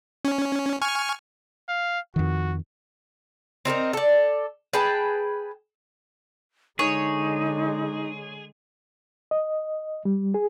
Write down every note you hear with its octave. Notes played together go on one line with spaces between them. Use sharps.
C#4
G#5 C#6 F6
F5
F2 D#3 F#4
C4 D#4 G#4 A#4
A4 D5
G#4 B4 G5 A5
D3 G#3 D#4 G#4 C#5
D#5
G3
G#4